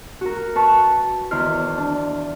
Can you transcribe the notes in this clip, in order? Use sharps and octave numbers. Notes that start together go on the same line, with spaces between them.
F#4 A#4
B4 A5 C#6
E2 D#3 E4 C5 F6
D4